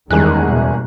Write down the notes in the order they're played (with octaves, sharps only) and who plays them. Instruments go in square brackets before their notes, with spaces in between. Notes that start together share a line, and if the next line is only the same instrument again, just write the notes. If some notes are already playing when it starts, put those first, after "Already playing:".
[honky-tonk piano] F#1 G#4 F#6 [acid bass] E2 [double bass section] D#3 G3 G#3
[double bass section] B2